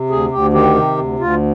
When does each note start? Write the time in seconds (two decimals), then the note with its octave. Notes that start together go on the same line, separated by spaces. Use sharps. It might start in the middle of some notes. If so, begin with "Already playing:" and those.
Already playing: C3
0.10 D2 G#4
0.31 D2 G4
0.53 D#3 G4
0.75 C3
0.97 D2
1.19 D2 F4